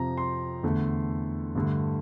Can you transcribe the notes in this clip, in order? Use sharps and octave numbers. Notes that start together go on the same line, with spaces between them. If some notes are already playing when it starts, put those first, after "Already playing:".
Already playing: F2 C3 F3 A#5
C6
E2 D3 A3
G2 D3 A3